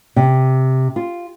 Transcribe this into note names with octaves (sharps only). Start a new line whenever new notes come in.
C3
F4